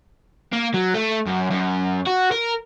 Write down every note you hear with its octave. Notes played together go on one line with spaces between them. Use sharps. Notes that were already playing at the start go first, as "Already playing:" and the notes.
A#3
F#3
A3
F#2
F#2
F#4
A#4